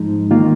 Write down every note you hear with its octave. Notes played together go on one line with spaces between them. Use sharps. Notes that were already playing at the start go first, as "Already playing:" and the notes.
Already playing: G#2 F3 G#3 D#4
D#3 A#3 F4